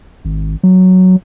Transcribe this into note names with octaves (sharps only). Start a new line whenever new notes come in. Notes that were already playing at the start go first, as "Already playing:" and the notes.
G#1
F#3